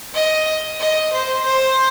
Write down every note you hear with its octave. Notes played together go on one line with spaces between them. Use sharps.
D#5
D#5
C5
C5